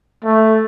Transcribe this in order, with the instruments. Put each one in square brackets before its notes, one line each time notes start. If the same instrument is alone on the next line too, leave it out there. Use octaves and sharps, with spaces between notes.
[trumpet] A3